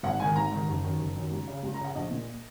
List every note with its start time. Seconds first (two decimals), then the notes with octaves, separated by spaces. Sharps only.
0.03 G#1 F#5
0.20 G#2 D#3 G#5
0.36 G#1 A#5
0.51 G#2 D#3
0.68 F#1
0.83 F#2 D#3
0.99 F#1
1.15 F#2 D#3
1.32 C#2
1.48 C#3
1.63 C#2
1.74 C#3 A#5
1.84 F#5
1.95 A#1 D#5
2.11 A#2